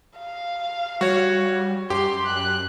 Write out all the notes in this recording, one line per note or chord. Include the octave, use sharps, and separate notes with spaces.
F5
G3 F#4 C#5
F#2 G4 C6
F#6